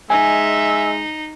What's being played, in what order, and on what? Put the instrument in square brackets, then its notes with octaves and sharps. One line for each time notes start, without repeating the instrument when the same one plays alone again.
[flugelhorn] G#3 [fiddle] D#4 [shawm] E5 [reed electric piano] G#5